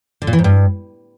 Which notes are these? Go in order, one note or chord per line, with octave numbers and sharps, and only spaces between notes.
D3
A#2
E3
G#2
G2